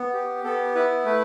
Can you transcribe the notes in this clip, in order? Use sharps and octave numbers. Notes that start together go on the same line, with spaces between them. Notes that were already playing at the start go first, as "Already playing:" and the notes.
Already playing: B3
G4
B3 A4
E4 B4
A3 B4